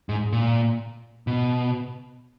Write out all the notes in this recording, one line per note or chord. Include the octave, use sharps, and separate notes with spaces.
G#2
A#2
B2